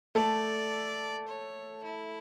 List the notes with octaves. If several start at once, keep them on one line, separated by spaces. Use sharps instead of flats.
A3 A4 D5
C#5
E4